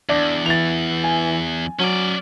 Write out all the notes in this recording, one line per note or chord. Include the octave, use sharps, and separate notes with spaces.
E2 D4
E3 A6 F7
G#5
F#3 C#4 D5